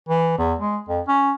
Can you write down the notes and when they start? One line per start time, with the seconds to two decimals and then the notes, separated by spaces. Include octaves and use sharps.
0.09 E3
0.38 E2
0.59 G#3
0.89 F2
1.08 C#4